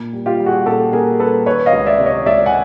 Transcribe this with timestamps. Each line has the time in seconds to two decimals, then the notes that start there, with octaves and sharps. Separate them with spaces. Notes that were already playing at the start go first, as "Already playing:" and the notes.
Already playing: A#2
0.13 G3
0.26 F4 G4
0.40 G3
0.46 F#4 G#4
0.66 A#2 G4 A4
0.93 A#2 G#4 A#4
1.20 G3 A4 B4
1.46 D#3 B4 C#5
1.66 D#5 F5
1.73 C#2
1.86 D5 E5
1.99 C3
2.06 C#5 D#5
2.26 C#2 D5 E5
2.46 F#5 G#5